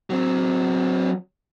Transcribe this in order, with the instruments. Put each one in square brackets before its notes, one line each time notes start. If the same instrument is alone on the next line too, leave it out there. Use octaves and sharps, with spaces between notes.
[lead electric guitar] F#3 C4